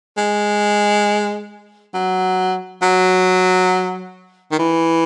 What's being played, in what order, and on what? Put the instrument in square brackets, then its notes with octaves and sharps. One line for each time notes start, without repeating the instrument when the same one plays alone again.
[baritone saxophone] G#3
F#3
F#3
D#3
E3